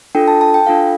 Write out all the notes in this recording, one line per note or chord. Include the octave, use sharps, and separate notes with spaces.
D4 F4 A4 G5
A5
A5
G5
D4 F4 A4 F5